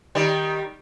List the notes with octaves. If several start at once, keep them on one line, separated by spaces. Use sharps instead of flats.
D#3 G3